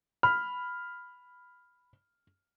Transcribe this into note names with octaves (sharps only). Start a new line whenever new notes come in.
B5 F6